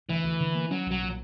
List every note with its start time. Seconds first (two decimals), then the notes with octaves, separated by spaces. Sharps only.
0.09 D2 E3
0.24 D2
0.40 D3
0.55 A#3
0.70 F#3 C#4
0.86 B1 F#3
1.02 A#2